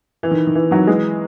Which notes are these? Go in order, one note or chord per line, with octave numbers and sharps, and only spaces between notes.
E3
D#3
D#3
E3
D#3 F#3
E3 G#3